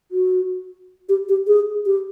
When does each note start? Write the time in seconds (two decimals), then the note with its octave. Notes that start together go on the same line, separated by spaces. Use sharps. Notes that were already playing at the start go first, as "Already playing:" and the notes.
0.12 F#4
1.09 G4
1.29 G4
1.47 G#4
1.86 G4